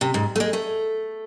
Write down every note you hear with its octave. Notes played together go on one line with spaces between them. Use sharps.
C3
G#2
A3
G#3
A3